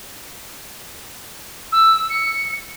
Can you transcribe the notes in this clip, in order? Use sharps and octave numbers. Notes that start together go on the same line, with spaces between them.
E6
C#7